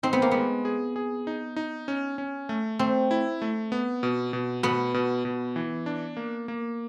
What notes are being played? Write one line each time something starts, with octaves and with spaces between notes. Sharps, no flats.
C4 D#4
B3
A#3
G#3 B3
G#4
G#4
D#4
D#4
C#4
C#4
A3
A3 C4
E4
A3
B3
B2
B2
B2 B3
B2
B2
E3
D4
A#3
A#3